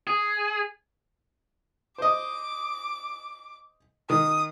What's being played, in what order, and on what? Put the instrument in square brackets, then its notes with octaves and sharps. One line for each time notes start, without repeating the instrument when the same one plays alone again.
[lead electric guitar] G#4
[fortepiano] C5 D#5 [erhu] D6
[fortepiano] D#3 [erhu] D#6